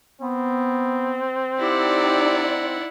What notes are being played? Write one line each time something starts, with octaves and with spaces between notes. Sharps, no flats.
B3 C4
D#4 E4 G4 D5 F#5